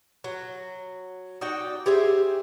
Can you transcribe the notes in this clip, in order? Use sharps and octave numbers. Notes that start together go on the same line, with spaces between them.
F#3
D#4 F#4 D5 G5
G4 G#4 C5 E5